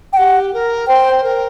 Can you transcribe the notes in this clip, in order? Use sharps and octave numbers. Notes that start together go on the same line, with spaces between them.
G5
G4 F#5
A#4
C5 G5
A#4